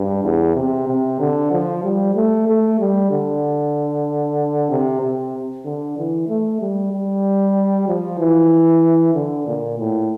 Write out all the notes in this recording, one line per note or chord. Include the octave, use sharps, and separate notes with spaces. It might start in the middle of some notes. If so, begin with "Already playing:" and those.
Already playing: G2
E2
C3
C3
D3
F3
G3
A3
A3
G3
D3
C3
C3
D3
E3
A3
G3
G3
F3
E3
D3
A#2
A2